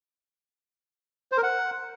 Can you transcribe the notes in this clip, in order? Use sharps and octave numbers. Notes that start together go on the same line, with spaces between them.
C5
A#4
F#5